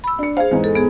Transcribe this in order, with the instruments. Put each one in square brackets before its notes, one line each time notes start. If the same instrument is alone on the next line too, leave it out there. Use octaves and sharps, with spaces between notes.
[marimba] B5 E6
[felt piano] D4 C#7
[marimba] G#4 C5 [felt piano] F5
[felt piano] E2 G#2
[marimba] A4
B3 G#4